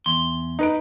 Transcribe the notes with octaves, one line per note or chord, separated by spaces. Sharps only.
E2 C6
D#4 B4 D7